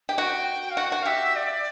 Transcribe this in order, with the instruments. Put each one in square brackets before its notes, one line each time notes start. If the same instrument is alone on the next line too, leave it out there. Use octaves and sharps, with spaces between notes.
[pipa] G4
[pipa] F#4 [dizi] G5
[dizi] F5
[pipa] F#4 [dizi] F#5
[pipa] F#4
[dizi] F5
[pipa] G4 [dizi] E5
[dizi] D5